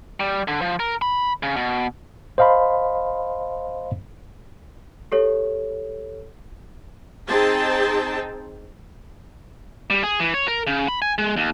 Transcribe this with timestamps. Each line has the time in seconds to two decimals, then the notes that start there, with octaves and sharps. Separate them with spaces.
0.20 G3
0.48 D3
0.62 F3
0.80 A#4
1.02 B5
1.43 C#3
1.57 B2
2.38 C5 D#5 F5 A5 B5 C6
5.12 G4 A4 C#5
7.28 C4 D#4 G#4 C5 G5 A5
9.90 G3
10.03 G#4
10.20 E3
10.34 C#5
10.48 A#4
10.67 C#3
10.88 B5
11.02 G#5
11.18 G#3
11.37 D#2